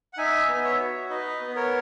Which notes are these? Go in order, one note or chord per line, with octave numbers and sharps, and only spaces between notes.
F#5
D#4 E5 G#5
B3
C#5 E5
F#4
D#4 B4 D#5
B3
A#4 C#5